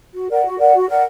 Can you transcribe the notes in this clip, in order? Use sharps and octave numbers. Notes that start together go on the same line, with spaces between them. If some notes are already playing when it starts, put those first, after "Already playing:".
F#4
A#4 D5 F#5
F#4
A#4 D5 F#5
F#4
A#4 D5 F#5